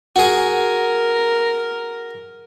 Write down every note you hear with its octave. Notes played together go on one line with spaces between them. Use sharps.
F#4 G#4 A#4